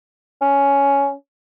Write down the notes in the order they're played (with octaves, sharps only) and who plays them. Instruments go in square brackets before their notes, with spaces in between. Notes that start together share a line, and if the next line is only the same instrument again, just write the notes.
[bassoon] C#4